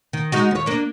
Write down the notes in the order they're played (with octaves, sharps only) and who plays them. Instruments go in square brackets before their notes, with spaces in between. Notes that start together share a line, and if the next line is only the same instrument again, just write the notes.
[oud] D#3
G#3 D#4 F#4
D#2 C#5
A#3 D4